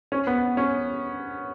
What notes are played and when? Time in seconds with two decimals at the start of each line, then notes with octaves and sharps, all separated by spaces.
0.12 C#4
0.27 B3
0.57 C#4